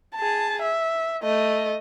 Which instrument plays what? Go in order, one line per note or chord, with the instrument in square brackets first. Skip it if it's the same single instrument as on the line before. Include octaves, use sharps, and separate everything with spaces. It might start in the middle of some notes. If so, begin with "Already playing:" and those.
[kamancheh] G#4 A5
E5
A3 D#5